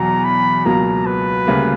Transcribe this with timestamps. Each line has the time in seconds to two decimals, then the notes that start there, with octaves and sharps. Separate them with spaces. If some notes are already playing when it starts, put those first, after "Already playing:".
Already playing: E2 B2 F#3 A#5
0.24 B5
0.65 C#2 B2 F#3 A#3 A#5
1.06 B4
1.47 D2 C#3 G3 A#3